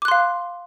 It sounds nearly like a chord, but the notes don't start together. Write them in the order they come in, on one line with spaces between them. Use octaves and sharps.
D6 F#6 C6 F5